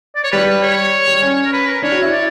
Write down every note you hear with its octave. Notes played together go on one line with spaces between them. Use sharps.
D5
C#5
G3 B4
C#5
G3
C#4
A#4
B4
A#4
D4 C#5
F#4
E4
D5